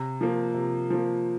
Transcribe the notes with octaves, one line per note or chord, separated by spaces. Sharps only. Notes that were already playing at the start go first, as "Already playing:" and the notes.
Already playing: C3
F3 A#3
C3
F3 A#3